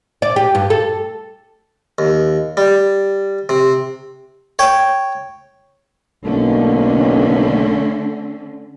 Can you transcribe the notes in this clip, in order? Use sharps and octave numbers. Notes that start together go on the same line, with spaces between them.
D5
G4
G2
A4
D#2
G3
C3
C#5 G5
B1 D3 A3 A#3 C#4